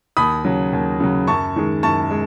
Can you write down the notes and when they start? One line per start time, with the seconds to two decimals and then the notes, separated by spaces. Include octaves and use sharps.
0.17 D#2 B5 D#6
0.45 C#3 F#3
0.73 D#2
1.00 C#3 F#3
1.27 F#2 A5 C#6
1.56 D#3 G#3
1.83 F#2 A5 C#6
2.11 G#3